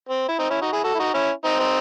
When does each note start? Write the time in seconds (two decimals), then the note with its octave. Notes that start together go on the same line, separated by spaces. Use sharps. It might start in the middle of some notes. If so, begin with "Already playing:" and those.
0.09 C4
0.28 E4
0.39 C4 D#4
0.50 C#4 E4
0.61 D#4 F#4
0.73 E4 G#4
0.84 F#4 A4
0.95 E4
0.99 D#4 F#4
1.14 C#4 E4
1.45 C4 D#4
1.60 C4 D#4